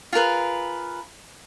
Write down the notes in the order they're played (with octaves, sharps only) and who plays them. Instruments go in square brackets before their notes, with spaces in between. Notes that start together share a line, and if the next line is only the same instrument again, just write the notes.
[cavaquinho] F4 G#4 A#4 B4